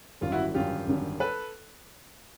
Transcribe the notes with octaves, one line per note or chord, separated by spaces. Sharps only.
G#1 F#2 D3 G3 F4
E4 F#4
G#1 F#2 D3 G3 F4 G4
G#1 F#2 D3 G3
A4 B4